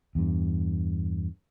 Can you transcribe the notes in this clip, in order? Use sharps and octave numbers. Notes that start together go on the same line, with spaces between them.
E2 G2